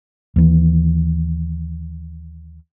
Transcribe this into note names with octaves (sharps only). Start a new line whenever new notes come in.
D#2 E3